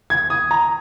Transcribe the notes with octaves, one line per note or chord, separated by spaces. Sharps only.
G#6
D#6
A#5